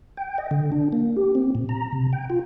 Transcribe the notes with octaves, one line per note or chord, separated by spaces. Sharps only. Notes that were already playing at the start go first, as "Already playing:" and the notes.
G5
D#5
D3
D4
A#3
G4
C4
A#2
A#5
C3
G5
F4